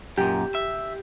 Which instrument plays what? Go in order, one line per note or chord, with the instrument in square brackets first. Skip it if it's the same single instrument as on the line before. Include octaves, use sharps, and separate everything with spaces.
[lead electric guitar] F#2 A#2 [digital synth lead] G4
[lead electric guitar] E5